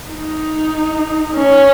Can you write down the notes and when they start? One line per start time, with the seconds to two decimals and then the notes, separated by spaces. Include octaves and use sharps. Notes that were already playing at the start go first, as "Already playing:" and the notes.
0.10 D#4
1.35 C#4